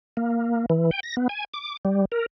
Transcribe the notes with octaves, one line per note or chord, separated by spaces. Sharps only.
A#3
E3
G5
A#6
B3
G#5
D6
G3
A#4